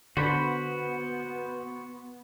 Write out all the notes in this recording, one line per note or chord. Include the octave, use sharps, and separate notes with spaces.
D3 B3 F#4 C5 B5